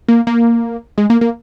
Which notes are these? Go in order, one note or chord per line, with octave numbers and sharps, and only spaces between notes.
A#3
A#3
G#3
A#3
A#3